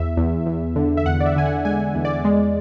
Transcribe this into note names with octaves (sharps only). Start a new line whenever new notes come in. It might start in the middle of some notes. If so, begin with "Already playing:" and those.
Already playing: E2 E5
E2
E2
D3
E5
E2 F#5
D5
E5
D3 G#5
F#5
G#3 G#5
E2
D5
G#3